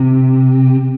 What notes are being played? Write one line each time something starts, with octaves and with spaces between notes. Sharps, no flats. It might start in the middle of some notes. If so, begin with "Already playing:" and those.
Already playing: C3